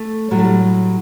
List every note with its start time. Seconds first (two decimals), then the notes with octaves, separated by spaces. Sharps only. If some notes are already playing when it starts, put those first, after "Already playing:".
Already playing: A3
0.31 A2 F#3 G3
0.39 A3
0.44 G3